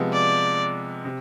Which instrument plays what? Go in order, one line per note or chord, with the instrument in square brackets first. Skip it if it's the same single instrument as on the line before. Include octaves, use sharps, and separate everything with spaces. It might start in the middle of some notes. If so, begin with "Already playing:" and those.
Already playing: [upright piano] C3 F3 G#3 B3
[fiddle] D5
[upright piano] C3